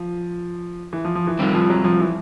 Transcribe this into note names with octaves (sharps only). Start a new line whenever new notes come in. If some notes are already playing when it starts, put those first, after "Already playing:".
Already playing: F3
E3
F3
F3
E3
D#3 G3 C4 F4
F3
F#3
F3
E3